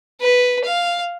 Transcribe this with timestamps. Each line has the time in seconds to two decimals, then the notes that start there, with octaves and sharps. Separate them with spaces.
0.21 B4
0.65 F5